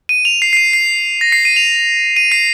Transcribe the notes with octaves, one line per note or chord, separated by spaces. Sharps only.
D#7
F7
C7
C7
D#7
C7
A#6
C7
D#7
F7
D#7
C7